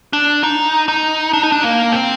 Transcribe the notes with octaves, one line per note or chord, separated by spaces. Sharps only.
D4
D#4
D#4
D4
D#4
D4
A#3
C4